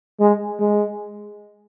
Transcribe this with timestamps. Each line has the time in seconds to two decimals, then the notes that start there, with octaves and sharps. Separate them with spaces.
0.20 G#3
0.60 G#3